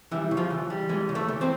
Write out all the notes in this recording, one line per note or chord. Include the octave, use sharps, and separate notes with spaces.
E3 G3 E4
C#3
F3 F4
E3
G3
E3 G#3 G#4
C#3
A3 A4
E3
C4 C5